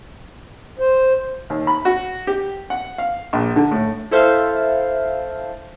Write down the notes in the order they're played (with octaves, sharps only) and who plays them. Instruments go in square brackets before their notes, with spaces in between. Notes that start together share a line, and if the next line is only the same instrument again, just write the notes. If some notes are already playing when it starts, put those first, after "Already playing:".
[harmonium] C5
[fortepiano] D#2
B5
F#4
G4
F#5
F5
A#1
D3
A2
[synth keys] E4 A4 C5 E5 F5